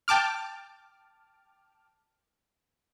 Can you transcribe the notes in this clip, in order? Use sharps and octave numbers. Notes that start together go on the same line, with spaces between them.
G5 A5 D6 F6